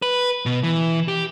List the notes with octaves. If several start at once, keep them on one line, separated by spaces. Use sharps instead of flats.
B4
B2
E3
G4